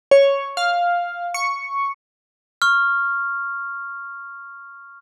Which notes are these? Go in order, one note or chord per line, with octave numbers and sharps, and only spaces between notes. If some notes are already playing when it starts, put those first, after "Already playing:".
C#5
F5
C#6
C#6 F6